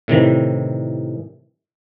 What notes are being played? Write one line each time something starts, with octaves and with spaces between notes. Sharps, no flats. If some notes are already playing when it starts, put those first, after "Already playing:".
A2 C3 D#3 E3